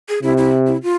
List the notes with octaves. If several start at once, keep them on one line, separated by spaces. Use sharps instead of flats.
G#4
C3 E4
E4
E4
F4